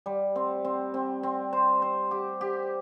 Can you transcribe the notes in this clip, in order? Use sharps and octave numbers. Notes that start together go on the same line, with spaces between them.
G3
C4
C4
C4
C4
C5
C5
G4
G4